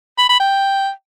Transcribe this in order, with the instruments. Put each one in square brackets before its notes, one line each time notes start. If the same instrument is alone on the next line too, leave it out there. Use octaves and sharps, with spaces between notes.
[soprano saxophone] B5
B5
G5